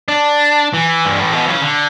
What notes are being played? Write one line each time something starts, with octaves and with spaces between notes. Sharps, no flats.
D4
E3
G2
A2
B2
C#3
D3